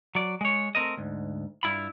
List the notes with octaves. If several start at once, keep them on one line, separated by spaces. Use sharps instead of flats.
F#3 D5
G#3 C#5
A3 C4 A#4 D#5
D2 G#2
G2 E4 F4 B5